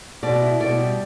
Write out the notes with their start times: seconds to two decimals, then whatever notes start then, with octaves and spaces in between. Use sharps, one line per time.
0.23 B2 D5
0.42 E4
0.60 B2 D5
0.79 G3